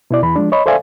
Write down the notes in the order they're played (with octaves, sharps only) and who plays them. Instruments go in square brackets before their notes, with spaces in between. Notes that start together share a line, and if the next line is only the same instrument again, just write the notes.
[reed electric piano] B2 E4 D5
E2 E3 B5
F3 G#3 D4
C#5 D#5 B5
A4 C5 D5 E5 F5 G#5